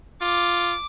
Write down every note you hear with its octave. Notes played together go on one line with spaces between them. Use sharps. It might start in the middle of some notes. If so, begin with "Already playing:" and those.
F4 D6